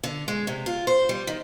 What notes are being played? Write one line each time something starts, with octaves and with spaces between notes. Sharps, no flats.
D3
G#3
C3
F4
C5
G3
D#3